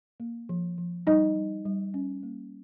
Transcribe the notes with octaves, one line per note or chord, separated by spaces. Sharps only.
A#3
F3
F3
G3 D#4 D#5
G3
G3
C#4
A#3